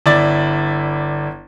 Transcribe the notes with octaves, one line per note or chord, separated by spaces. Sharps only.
G1 E4 D5 A6